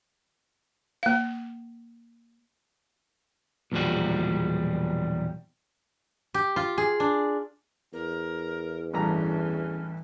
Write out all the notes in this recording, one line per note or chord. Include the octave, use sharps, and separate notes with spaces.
A#3 F5
B1 E2 A#2 F3 G3 F#4
G4
F4
G#4
D4
E2 A#4
A1 G2 E3 C#4 A#5